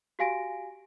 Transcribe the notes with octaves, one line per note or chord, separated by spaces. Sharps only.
F#4 G4 F5 G#5 A#6 D7